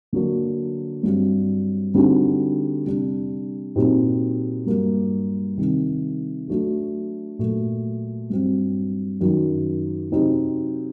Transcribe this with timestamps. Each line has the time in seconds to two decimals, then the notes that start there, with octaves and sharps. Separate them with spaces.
0.13 D3 F#3 A#3 D4
1.03 G2 F#3 C4
1.94 D3 G3 C4 D#4 F#4
2.85 C3 G3 D4
3.76 A#2 F#3 C4 D#4 G4
4.66 G2 F#3 A#3
5.57 C3 D#3 G3
6.48 F#3 A3 D4 F#4
7.39 A#2 F#3 A3
8.30 G2 F#3 C4
9.21 F#2 D#3 F#3
10.11 C3 F#3 C4 D#4 G4